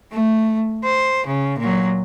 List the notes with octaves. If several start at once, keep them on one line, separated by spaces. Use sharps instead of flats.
A3
C5
C#3
A#2 F#3